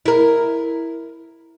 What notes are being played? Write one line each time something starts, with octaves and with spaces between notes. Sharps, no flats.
E4 A#4